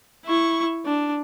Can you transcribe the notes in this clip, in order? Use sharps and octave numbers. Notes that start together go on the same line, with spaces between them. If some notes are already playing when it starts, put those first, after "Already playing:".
E4 C#6
D4